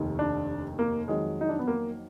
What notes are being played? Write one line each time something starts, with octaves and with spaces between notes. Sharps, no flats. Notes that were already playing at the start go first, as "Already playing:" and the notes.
Already playing: F1 D#2 D#3
D4
A#3
F2 D#3 F#3 G#3
D#4
D4
B3
A#3